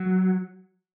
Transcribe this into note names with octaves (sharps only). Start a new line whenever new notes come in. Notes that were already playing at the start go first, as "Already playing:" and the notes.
Already playing: F#3